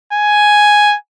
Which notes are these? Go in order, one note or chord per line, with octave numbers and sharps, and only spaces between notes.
G#5